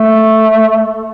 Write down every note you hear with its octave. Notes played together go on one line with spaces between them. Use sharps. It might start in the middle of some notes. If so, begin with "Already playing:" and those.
Already playing: A3